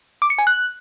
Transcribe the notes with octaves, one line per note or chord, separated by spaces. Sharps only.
D6
C#7
G#5
F#6